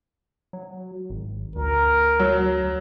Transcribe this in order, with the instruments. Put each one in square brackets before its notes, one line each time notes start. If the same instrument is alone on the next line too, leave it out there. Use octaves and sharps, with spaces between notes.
[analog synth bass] F#3
G#1
[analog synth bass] D2 [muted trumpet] A#4
[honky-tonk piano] F#3